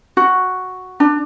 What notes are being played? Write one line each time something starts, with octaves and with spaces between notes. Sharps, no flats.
F#4
D4